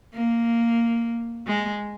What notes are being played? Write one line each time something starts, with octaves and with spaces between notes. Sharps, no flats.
A#3
G#3